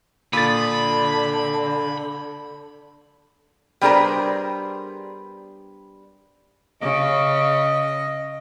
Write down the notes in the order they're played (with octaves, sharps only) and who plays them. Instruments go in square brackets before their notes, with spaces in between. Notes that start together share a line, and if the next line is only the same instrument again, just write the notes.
[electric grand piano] A#2 [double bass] D3 [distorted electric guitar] B5 [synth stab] D#6 A6
[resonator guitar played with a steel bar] G3 B3 D4 G#4 A#4 C5
[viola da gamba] C#3 [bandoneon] D#5